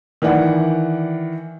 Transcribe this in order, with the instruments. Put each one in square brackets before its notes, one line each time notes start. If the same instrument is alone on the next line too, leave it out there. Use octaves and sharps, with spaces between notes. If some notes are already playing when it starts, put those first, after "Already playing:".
[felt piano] D#3 E3 D5 F#5